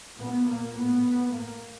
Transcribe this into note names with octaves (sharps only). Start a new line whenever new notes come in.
A#2 B3
A#2 A#3
A2 B3
A2
A2 A#3